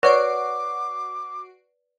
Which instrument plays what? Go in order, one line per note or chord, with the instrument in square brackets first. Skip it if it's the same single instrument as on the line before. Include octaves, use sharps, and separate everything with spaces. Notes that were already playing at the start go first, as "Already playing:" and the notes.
[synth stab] F#4 C7 D7 [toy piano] B4 D5 [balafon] C#5 [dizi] D6